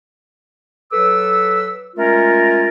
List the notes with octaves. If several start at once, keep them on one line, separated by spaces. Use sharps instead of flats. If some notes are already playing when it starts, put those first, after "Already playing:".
F#3 A4 B4 D6 E6
G#3 A3 C#4 F4 A#4